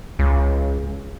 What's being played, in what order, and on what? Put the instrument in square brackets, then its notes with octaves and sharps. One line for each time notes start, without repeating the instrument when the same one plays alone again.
[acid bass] C#2